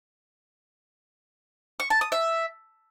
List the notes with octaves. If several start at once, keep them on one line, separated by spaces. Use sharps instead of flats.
C#6
A5
D#6
E5